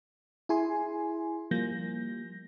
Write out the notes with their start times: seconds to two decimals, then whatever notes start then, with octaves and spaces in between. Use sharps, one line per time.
0.49 E4 G#4 G#5 C6
1.51 F3 G3 A#3 G6 A#6